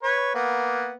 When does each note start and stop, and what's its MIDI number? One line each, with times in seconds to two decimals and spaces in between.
0.03 0.33 71
0.03 0.33 73
0.34 0.92 58
0.34 0.92 59